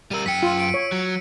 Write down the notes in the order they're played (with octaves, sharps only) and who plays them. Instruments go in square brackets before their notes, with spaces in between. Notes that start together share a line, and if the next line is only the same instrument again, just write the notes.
[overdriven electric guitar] G3 A#4 [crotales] E6 D#7
[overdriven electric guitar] F#2 G5 [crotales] B6 C#7
[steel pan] F4
[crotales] D7
[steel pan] C#5
[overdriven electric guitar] F#3